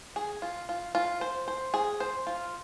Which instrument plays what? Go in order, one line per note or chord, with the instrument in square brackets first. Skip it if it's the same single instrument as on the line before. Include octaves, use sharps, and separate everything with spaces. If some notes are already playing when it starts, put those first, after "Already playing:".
[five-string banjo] G#4
F4
F4
F4
C5
C5
G#4
C5
F4